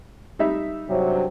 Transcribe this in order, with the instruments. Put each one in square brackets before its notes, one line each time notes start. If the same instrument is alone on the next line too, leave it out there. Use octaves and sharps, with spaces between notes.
[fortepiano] G3 D#4 E5
[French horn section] G2 C3 F#3